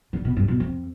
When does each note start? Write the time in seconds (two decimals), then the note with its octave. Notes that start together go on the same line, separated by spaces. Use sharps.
0.13 D3
0.25 B2
0.37 G2
0.48 B2
0.60 F2